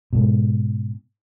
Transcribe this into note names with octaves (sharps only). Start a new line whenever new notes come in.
G#2 B2